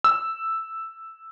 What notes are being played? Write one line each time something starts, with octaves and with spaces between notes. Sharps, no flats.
E6